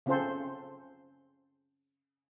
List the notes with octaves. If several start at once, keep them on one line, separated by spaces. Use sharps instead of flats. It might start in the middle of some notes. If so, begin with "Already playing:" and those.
C#3 C4 C#4 F4 A4 C5